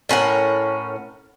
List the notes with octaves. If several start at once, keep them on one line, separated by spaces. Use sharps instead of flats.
A2 C#4 A#4 F#5